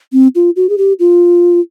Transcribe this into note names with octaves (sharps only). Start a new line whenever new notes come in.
C4
F4
F#4
G#4
G4
F4